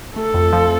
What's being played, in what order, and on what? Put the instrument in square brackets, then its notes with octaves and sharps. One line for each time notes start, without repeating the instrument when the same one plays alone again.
[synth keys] A3 [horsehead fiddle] A4
[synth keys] F2
F3